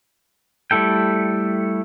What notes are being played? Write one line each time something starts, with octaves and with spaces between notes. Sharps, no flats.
G3 A3 E4 A4 G5